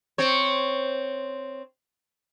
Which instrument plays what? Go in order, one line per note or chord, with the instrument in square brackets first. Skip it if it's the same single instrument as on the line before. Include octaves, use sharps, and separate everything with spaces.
[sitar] C4 C#5